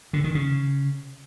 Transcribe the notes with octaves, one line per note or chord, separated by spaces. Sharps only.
D3
D#3
C#3